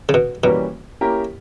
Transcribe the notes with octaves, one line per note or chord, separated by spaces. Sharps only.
C#3
B2
B2 E3 G3 A#3 C#4
A#3 C#4 E4 G4 A#4